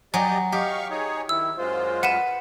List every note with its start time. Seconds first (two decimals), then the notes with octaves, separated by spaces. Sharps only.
0.14 F#3 G4 D5 D#5 G#5
0.52 G4 D#5 F5 C#6
0.91 D#4 G#4 C#5
1.29 D#3 E4 E6
1.58 F#2 G#3 F4 C5
2.03 B4 F#5 D#7 E7